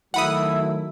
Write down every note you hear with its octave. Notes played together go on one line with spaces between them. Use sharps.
D#3 F#3 A3 E4 F#5 B5 D#6